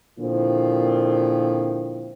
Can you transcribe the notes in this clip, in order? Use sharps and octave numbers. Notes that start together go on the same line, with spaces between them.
A#2 D3 D#3 F3 C4 E4